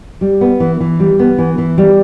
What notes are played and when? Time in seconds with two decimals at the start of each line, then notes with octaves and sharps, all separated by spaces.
0.21 G3
0.41 B3
0.60 E3
0.80 E3
1.00 G3
1.19 B3
1.38 E3
1.58 E3
1.78 G3